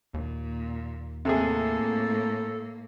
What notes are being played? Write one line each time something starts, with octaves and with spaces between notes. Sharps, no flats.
D#2 A#2
A2 C3 A#3 G#4 A4